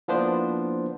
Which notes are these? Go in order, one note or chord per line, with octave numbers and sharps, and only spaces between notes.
F3 A#3 B3 D4 E4 C5